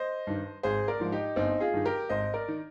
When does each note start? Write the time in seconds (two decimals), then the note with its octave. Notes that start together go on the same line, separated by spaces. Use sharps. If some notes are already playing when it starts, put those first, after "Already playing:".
Already playing: C5 D#5
0.27 G2 D#3
0.63 G#1 G#4 C5
0.88 A#4 D5
1.00 G#2 F3
1.12 D#4 G4
1.36 G1 C4 D#4
1.60 F4 G#4
1.74 G2 D#3
1.85 G4 A#4
2.09 G#1 C5 D#5
2.34 A#4 D5
2.48 D#3